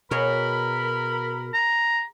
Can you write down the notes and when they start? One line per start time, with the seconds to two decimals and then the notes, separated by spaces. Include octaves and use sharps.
0.11 B2 F#4 G#4 A#4 C#5 B5
1.54 A#5